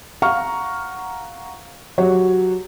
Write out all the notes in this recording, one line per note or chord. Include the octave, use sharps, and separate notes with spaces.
F5 F#5 A#5 C#6 F6
F#3 F#4 G4 C#5